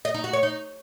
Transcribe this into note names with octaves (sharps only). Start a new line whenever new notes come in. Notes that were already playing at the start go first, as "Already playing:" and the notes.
D#5
D#4
F#4
C#5
D#4